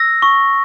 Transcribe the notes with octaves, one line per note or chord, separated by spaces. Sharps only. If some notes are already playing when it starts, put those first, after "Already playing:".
Already playing: E6 A#6
C#6